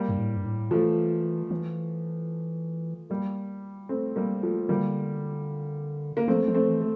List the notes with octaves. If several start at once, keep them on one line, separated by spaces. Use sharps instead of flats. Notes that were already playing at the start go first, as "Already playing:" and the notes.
Already playing: G3 A#3
G2
A2
G2
A2
E3 F3 A3
E3
G3 A#3
A3 C4
G3 A#3
F3 A3
D3 G3 A#3
A#3
F3 A3 C4
F3
A3 C4
E3
A3